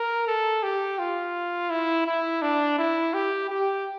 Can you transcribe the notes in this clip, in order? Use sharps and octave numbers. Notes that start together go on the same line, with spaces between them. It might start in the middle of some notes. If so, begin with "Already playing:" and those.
Already playing: A#4
A4
G4
F4
E4
E4
D4
E4
G4
G4